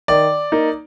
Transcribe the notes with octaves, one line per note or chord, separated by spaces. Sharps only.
D#3 D5
A#3 D#4